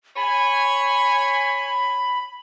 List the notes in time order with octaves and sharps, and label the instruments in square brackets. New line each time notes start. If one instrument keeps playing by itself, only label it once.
[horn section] C#5 G#5 [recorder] B5